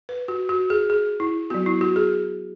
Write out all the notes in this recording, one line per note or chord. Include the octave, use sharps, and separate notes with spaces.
B4
F#4
F#4
G#4
G#4
E4
F#3 B3 F#4
E4
F#4
G#4